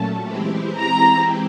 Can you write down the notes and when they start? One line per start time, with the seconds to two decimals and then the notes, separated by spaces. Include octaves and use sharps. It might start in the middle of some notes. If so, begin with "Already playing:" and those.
Already playing: A#2 F#3 A3 C#4 A5
0.24 E3 G#3 C4 E4 G4
0.78 A#5